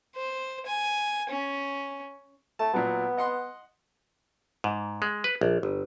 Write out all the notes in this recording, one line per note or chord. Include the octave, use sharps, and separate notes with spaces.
C5
G#5
C#4
A3 A5
A#2 F#3 B3
D#5 F#5 C6
G#2
G#3
B4
A#1
G1